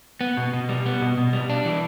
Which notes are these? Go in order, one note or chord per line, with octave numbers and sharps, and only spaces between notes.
B3
B2
B2
G3
B3
B2
B2
G3
D4
E3